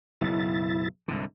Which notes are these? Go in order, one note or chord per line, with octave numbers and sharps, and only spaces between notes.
F#1 B1 E4 A6
C2 G#2 D3